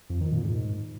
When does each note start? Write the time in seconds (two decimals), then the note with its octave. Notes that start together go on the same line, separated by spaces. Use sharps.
0.10 F2
0.21 D#3
0.32 A#2
0.44 G#2